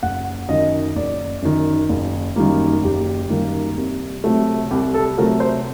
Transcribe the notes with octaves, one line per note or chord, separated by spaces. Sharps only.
F#1 F#5
F#2 D#3 D#5
F#1 D5
F#2 D#3
F#1
F#2 D#3 G3 A#3
F#1 G4
F#2 D#3 G3 A#3
C2
C3 F#3 A3
C2 G4
A4
C3 F#3 A3 A#4
C5